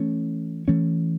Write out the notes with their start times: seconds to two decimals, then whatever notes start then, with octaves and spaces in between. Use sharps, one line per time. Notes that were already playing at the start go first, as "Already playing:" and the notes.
Already playing: E3 A3 C#4
0.68 E3 A3 C#4